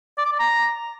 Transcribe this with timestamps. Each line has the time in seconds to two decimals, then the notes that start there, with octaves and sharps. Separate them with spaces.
0.18 D5
0.25 D6
0.32 D5
0.39 A#5